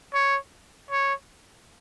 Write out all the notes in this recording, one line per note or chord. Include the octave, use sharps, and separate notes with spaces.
C#5
C#5